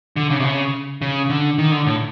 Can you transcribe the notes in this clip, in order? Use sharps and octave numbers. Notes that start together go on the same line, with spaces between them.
D3
C#3
C3
C#3
C#3
D3
D#3
D3
A2